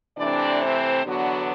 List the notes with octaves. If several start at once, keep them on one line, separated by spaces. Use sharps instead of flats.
C3 E3 A3 C4 D4 D5
C4 C5
E2 D3 F#3 B3 D4 F#4